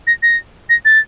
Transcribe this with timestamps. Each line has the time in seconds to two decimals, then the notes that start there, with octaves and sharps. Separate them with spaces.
0.07 A#6
0.23 A#6
0.69 A#6
0.85 A6